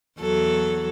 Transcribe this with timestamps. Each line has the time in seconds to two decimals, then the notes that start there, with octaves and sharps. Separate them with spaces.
0.20 E2 F#3 A4